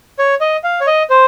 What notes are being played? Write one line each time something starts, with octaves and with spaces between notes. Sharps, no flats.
C#5
D#5
F5
C#5
D#5
C5